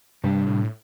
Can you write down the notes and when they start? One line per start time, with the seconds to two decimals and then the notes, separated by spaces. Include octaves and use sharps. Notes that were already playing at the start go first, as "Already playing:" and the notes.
0.24 G2 C3 G3 D4
0.47 A2